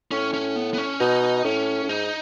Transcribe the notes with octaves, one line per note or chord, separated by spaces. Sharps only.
A2 C#4
C#4
B3
B3
C#4
B2 D#4
A2 C#4
A2
G#2 D#4